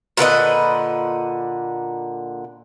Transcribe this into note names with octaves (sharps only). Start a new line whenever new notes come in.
A#2 D3 B4 D#5